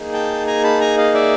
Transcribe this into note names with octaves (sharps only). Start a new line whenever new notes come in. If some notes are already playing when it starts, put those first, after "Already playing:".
Already playing: A#3 D#4 G#4
G5 A5
G#5 A#5
A5 B5
G#5 A#5
D#5 F5
D5 E5